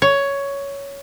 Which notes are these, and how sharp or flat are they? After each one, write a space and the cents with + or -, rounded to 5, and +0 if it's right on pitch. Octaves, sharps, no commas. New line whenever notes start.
C#5 +10